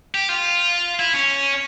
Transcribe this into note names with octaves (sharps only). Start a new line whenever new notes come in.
G4
F4
E4
C#4